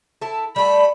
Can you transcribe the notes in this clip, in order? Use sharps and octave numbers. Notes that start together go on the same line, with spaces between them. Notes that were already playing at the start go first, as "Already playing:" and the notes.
E4 A4
G3 A3 B5